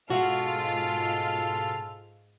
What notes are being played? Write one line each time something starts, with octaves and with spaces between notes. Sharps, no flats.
G#2 B2 F4 F#4 A4 F6